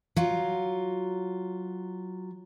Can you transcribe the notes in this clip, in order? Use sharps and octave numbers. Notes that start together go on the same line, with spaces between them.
F#3 F4